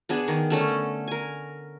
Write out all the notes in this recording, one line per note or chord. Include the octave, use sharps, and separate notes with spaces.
B3 D4 G#4
D#3
D3 A3 C#4
A#4 G#5